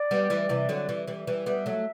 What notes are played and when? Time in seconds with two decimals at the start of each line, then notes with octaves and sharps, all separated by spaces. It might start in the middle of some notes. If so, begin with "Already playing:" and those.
Already playing: D5
0.11 G3 B3
0.30 E3 G3
0.49 C3 E3
0.69 D3 F#3
0.89 E3 G3
1.07 E3 G3
1.27 E3 G3
1.46 G3 B3 E5
1.66 F#3 A3